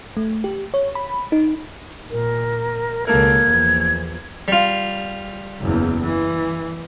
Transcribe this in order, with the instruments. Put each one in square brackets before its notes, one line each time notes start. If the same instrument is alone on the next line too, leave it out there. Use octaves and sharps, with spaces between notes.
[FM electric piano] A3
G4
C#5
B5
D#4
[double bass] A#2 [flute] A#4
[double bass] C#2 B2 [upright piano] A#3 A4 A#4 [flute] G#6
[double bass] E2 F3
[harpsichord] G3 F4
[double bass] F#1 E2
E3